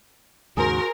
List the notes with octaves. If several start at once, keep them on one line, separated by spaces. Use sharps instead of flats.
D#2 G#2 C#3 F#4 G#4 A#4 C5